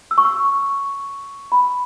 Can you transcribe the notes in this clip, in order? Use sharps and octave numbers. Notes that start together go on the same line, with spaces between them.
E6
C#6
E6
B5